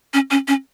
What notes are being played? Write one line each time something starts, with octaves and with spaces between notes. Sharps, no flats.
C#4
C#4
C#4